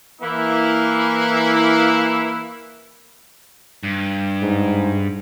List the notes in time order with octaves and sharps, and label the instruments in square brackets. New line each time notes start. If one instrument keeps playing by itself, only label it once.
[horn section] E3 A#3 E4
[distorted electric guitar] G2
[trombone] G#2